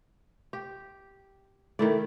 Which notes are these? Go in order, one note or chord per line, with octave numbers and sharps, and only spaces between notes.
G4
D#3 A3 E4 D5